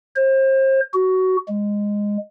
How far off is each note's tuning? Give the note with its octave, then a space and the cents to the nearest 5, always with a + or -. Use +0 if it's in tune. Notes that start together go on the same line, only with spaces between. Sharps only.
C5 +35
F#4 +15
G#3 -15